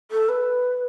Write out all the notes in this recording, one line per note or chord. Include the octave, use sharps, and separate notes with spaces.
A4
B4